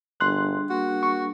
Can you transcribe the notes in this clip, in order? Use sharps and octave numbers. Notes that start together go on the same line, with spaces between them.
G1 G3 D4 G#4 C6 F#6
A#3 F#4
C#6